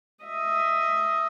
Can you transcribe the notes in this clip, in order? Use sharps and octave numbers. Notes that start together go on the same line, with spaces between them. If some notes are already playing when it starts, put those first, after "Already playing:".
D#5 E5